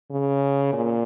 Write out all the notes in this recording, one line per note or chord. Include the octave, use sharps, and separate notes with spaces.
C#3
A#2